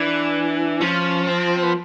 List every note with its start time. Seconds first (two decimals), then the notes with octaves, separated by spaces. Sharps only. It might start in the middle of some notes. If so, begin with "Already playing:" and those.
Already playing: E3 D4
0.81 F3 C#4
1.27 C4
1.63 B3